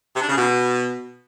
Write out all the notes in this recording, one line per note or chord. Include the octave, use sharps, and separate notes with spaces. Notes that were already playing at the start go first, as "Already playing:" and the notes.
C3
D4
C#3
B2